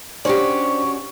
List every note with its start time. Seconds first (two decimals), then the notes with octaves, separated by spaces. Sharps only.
0.25 C#4 D4 F#4 G4 C5 D5 C#6